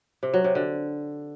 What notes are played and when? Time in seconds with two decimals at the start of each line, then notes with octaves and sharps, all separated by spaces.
0.23 C3
0.34 F#3
0.44 C3
0.55 D3